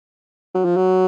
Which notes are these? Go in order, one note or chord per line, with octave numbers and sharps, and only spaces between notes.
F#3
F3
F#3